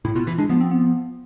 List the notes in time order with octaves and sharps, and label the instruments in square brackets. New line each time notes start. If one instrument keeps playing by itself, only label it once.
[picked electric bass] A2 [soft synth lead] E4
[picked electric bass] B2 [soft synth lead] F4
[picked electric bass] E3 [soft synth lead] E4
[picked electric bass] G#3 [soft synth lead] D4
[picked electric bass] F3 [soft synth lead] B3
[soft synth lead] C4
B3